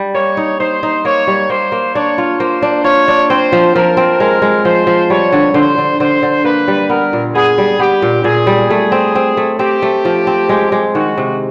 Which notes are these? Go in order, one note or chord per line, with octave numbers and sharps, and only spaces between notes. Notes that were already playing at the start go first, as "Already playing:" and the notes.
Already playing: G3
A#3 C#5
D#4
D#4 C5
D#4
A#3 C#5
G3
A#3 C5
A#3
D4 C#5
F4
A#3 C5
D4
F4 C#5
D4
C4 C5
F3
F3 A#4
C4
G#3 A#4
G#3
F3 C5
F3
G3 C#5
D3
D3 C5
D3
D3 C5
D3
A#3 B4
G3
B3 A#4
A#2
B3 G#4
G3
B3 G4
A#2
A#2 G#4
G3
A3 G#4
C4
C4
A3
C4 G4
A3
F3
C4
G#3
G#3
D#3 F#4
C3